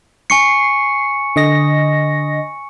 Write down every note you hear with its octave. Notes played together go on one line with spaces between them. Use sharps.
G#5 C#6 C7 C#7
D3 D#5 A#6